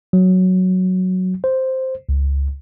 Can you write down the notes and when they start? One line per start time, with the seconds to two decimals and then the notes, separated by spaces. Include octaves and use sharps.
0.13 F#3
1.44 C5
2.09 C#2